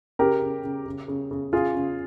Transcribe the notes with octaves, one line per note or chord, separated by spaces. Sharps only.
C#3 G4 A#4
C#3
C#3
C#3
C#3
C#3
C#3 F4 G#4
C#3